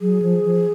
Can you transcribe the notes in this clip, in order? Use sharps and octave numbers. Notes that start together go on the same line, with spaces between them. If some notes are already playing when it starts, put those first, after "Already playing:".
F#3 G#4
F3
F3